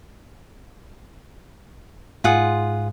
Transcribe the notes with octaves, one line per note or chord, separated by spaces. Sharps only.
G#2 F4 G#4 F#5